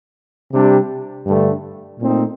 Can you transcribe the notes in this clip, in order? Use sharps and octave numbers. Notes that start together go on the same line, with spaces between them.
C3 G3 D4 G4
G2 D3 A3 D4
A#2 A3 C4 D#4